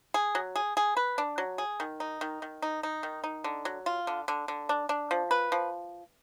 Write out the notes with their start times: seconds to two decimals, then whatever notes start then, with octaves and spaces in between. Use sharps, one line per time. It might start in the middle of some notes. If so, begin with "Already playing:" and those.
0.14 G#4
0.35 F#3
0.55 G#4
0.77 G#4
0.97 B4
1.18 D4
1.38 F#3
1.58 G#4
1.80 D#3
2.00 D#4
2.21 D#3
2.42 D#3
2.62 D#4
2.83 D#4
3.03 D#3
3.24 D#4
3.44 D3
3.65 F#3
3.86 F4
4.07 D3
4.28 D3
4.48 D3
4.69 D4
4.89 D4
5.11 F3
5.31 B4
5.52 F3